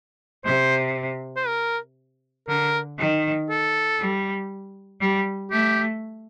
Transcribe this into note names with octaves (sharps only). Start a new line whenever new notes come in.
C3 C5
C5
A#4
D3 A#4
D#3
A4
G3
G3
A3 G4